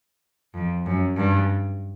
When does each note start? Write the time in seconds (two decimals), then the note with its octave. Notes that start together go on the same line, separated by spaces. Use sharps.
0.54 F2
0.86 F#2
1.17 G2